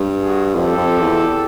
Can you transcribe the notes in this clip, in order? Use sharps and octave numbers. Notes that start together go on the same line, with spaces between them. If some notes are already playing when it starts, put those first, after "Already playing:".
Already playing: G2
F#4 G#4
F2 G4 A4
F2
E2